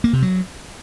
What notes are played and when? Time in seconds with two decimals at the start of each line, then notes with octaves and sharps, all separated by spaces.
0.04 A#3
0.13 C3
0.22 F#3